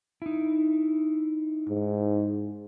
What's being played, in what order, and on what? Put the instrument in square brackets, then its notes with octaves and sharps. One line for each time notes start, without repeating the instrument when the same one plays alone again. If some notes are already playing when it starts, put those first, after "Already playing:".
[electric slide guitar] D#4 E4
[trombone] G#2